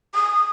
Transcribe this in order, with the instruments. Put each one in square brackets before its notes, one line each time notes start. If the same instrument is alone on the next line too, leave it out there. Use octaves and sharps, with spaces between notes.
[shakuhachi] D#6